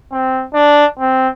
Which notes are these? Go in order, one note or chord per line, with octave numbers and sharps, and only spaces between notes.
C4
D4
C4